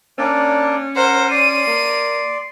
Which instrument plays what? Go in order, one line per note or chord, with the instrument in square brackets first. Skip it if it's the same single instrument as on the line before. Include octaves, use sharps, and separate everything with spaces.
[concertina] A#3 D4 D5 [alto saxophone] C#4
[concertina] A#4 F#5 [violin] C5
[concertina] D5 C6 [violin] D#7
[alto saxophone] A#3